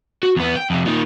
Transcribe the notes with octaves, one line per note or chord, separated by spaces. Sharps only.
F#4
E2 B3
G5
F2 C3
A#2 D#3